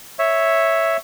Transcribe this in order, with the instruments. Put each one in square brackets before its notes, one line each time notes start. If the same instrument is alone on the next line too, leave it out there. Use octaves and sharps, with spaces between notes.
[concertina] C#5 E5